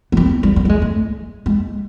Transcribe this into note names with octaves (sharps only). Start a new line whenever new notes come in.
B3
C4
G3
G3
A3
G#3
A3
G#3